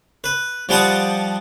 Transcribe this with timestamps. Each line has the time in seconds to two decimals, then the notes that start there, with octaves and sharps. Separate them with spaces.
0.24 B4
0.69 F3 G3 F#5 A5 D#6